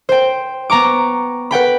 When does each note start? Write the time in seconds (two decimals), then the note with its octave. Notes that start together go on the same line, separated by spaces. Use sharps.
0.09 C5 G5
0.70 B3 A#5 C#6 D6
1.51 B4 F#5 G5 B5